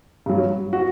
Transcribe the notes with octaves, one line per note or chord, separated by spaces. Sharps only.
G2 F#3
F#4